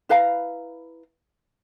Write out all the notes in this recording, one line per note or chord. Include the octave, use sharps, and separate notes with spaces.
E4 B4 F5 A#5